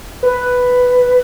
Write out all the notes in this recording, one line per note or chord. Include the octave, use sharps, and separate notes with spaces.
B4